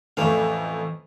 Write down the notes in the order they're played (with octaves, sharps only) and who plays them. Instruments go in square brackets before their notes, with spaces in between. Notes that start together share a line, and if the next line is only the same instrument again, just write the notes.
[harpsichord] A1 E3 F5 [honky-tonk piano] F2 A3